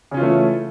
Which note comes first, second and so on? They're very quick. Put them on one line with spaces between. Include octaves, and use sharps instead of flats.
C#3 C#4 F4 E3 A3